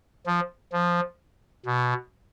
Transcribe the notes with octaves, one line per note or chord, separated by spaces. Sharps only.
F3
F3
B2